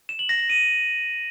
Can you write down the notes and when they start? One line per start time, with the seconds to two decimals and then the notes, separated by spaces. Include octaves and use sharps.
0.09 E7
0.19 F#7
0.29 A#6
0.39 A#6
0.50 D#7